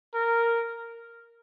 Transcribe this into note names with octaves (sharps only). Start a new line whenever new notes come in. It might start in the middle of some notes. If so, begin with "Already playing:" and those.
A#4